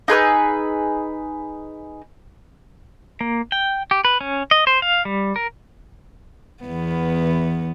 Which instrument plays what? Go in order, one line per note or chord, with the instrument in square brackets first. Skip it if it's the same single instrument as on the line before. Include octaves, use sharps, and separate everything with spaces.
[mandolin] D#4 G#4 B4 E6
[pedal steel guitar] A#3
G5
G4
B4
C#4
D#5
C5
F5
G3
A#4
[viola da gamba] E2 B3